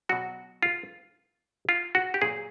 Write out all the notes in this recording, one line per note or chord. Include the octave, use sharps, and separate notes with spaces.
B2 F#3 F#4
F4
F4
F#4
G4
A#2 F#3 G#4